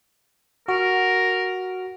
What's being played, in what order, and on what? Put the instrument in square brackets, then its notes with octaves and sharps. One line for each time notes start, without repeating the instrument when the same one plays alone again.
[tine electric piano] F#4 [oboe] A#4